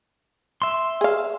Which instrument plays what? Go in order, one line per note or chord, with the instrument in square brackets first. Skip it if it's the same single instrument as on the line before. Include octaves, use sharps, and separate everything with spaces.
[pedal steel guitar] E5 C6
[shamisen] G#4 F5